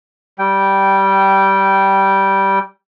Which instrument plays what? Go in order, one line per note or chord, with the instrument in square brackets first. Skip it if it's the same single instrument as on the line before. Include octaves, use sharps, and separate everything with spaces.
[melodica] G3 G5